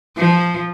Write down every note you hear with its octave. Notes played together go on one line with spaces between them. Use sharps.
F3